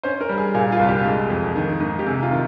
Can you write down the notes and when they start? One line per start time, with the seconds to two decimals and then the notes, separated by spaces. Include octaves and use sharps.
0.03 C#4 C5
0.21 A#4
0.29 G3
0.38 G#4
0.55 A#2 G#4
0.72 F4
0.79 C2
0.88 G4
1.06 G#3
1.30 F2
1.56 D#3
1.80 G#2
1.99 G4
2.06 C3 G#4
2.23 F4
2.31 D#3